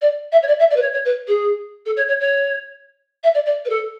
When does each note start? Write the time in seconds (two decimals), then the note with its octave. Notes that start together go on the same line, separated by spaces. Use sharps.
0.01 D5
0.32 E5
0.42 C#5
0.47 D5
0.59 E5
0.70 D5
0.76 B4
0.82 C#5
0.93 C#5
1.05 B4
1.28 G#4
1.86 A4
1.97 C#5
2.08 C#5
2.20 C#5
3.23 E5
3.34 D5
3.46 D5
3.65 B4
3.69 A4